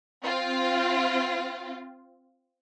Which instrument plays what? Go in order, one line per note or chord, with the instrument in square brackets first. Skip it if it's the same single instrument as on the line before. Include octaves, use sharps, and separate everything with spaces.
[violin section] C4 F4